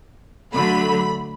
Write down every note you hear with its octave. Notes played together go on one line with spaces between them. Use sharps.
D3 F#3 A3 B5